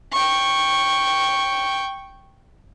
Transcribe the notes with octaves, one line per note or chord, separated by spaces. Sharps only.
G5 C#6